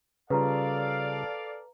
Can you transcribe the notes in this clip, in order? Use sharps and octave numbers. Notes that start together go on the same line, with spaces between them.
C#3 G3 F4 A4 B4 D5 F5 A#5